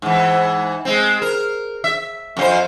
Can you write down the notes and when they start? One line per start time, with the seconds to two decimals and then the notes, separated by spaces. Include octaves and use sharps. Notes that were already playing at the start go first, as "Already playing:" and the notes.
0.02 G#2 E3
0.85 G#3 C4
1.22 A#4
1.84 E5
2.37 F2 C#4 C5